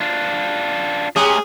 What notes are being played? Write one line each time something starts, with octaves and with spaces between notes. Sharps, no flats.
D4 F4
G#3 A3 C#4 G4 G#4 A#5